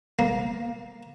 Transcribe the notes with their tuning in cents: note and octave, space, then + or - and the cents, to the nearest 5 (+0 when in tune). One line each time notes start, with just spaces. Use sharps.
A#3 +20